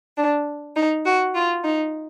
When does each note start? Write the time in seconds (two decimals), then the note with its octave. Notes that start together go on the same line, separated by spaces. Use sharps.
0.17 D4
0.76 D#4
1.05 F#4
1.34 F4
1.63 D#4